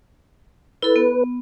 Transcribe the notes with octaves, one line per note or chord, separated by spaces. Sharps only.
E4 A4 B4
B3